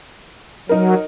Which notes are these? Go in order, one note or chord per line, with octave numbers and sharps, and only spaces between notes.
F#3 D#4 A#4